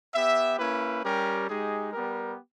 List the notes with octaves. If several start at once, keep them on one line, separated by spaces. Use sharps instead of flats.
B3 G4 E5
A#3 C#4 E4 B4
G3 C#4 G4 A#4
G#3 D#4 G4 G#4
G3 B3 G4 A#4